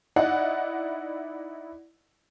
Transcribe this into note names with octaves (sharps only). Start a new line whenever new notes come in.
D#4 E4 D5 D#5 F#5